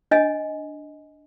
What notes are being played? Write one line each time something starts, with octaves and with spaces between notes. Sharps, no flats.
D4 D#5 G#5